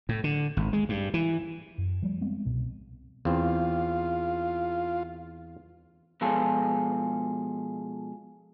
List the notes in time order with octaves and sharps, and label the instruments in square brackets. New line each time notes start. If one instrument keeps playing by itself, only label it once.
[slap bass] A2
D3
G#1
G#3
G2
E3
[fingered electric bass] F#2
F3 G3 A3
G3 G#3 B3 C4
C2 B2
[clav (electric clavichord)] E2 C4 [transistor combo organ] F4
[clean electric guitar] B2 F3 G#3 F4 G#4 A4